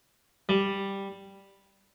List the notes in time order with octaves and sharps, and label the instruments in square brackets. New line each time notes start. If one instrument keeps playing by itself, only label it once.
[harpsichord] G3